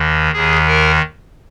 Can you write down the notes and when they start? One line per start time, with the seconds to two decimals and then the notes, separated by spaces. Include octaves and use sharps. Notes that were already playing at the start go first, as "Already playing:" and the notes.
Already playing: D#2 D#3
0.32 D#2 D#3 G#4
0.67 A#4